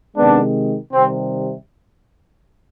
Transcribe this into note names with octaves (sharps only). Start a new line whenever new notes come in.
C3 D#3 G#3 B3 D4
C3 D#3 G3 C4